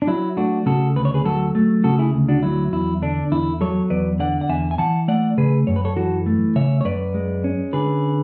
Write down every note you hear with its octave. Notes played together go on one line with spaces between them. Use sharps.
D4
F#3 E4
A3 D4 F#4
C#3 F#4 A4
D2 B4
C#5
G#4 B4
F#3 F#4 A4
A3
C#3 F#4 A4
E4 G#4
D2
D4 F#4
F#3 E4
E2 E4
D3 D4
E2 E4
F#3 A4 C#5
E2 B4 D5
D3 D5 F#5
F#5
E2 E5 G#5
G#5
E3 F#5 A5
A3 D5 F#5
C#3 G#4 B4
F#2 C#5
B4
A4 C#5
E3 F#4 A4
A3
C#3 C#5 E5
C#5
F#2 B4 D5
G#3
C#4
D3 G#4 B4